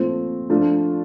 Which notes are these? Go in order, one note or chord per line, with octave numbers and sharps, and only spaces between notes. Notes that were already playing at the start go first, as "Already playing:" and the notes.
Already playing: A#2 F3 A3 C4
F3 A3 D4 F4